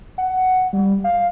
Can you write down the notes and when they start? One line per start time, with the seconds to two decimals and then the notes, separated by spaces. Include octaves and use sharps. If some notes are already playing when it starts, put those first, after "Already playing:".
0.18 F#5
0.73 G3
1.04 F5